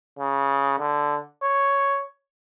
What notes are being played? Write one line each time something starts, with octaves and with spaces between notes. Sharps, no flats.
C#3
D3
C#5